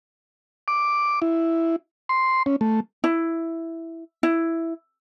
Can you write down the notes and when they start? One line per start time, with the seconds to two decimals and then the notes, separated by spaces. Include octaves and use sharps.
0.68 D6
1.22 E4
2.09 C6
2.46 C#4
2.61 A3
3.04 E4
4.23 E4